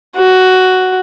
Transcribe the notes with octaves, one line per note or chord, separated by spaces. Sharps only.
F#4